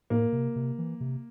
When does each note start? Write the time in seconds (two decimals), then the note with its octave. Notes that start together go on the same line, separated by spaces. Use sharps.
0.10 A2 A#3
0.32 C3
0.56 C3
0.79 E3
1.00 C3